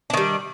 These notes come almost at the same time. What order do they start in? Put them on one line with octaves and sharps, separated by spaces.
D4 D#3 G3